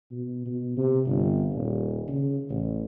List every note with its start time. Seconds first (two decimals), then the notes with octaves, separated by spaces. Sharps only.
0.12 B2
0.46 B2
0.77 C3
1.06 G1
1.53 D#1
2.08 C#3
2.50 A1